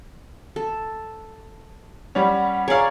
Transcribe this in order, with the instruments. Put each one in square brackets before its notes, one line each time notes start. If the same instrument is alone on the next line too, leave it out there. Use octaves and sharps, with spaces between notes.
[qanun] A4
[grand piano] G3 C#4 [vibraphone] F#5 B5
[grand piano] G#4 F5 [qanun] C#5 D5 [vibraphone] A#5